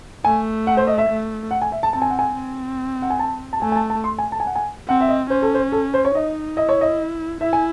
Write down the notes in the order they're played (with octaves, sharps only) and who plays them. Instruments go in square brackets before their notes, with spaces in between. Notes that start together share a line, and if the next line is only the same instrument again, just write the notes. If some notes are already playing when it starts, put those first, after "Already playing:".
[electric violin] A3 [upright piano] G#5
[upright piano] F#5
C5
D#5
E5
[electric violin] A3
[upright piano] F#5
G#5
E5
A5
[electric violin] C4 [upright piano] A5
[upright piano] G#5
F#5
G#5
[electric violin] C4
[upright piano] F#5
G#5
A5
A5
[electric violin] A3 [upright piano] G#5
[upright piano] G#5
A5
A5
C6
G#5
A5
G#5
F#5
G#5
[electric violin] C4 [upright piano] F#5
[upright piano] E5
D#5
[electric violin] C#4 [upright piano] C5
[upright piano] A4
C5
A4
C5
C#5
[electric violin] D#4 [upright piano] D#5
[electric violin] E4 [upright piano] D#5
[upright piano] C#5
D#5
[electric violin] E4 [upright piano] E5
[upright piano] G#5